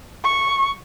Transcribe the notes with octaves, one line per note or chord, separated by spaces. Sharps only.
C#6